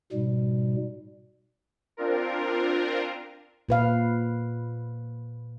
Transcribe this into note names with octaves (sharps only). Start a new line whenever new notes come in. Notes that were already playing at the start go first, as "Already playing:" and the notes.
G#2 B2 G3
C4 D4 F4 A#4
A#2 B4 F5